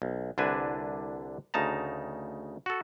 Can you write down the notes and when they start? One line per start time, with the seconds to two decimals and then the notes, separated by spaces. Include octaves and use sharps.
0.02 B1
0.38 C2 D3 D4 B4 G#5
1.54 D2 C#3 D#4 A5 A#5
2.66 F#4 A4